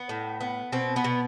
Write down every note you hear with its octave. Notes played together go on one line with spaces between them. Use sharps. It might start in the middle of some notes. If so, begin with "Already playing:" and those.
Already playing: B3
A2
B3
B2 C4
B3
B2